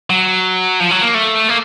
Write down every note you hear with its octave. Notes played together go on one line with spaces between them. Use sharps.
F#3
F3
F#3
A#3
A3
A#3